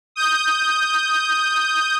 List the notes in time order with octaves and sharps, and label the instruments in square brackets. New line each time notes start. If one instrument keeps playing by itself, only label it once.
[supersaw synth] D#6 G6